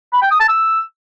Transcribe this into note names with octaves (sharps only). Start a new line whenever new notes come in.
B5
G5
D#6
A5
E6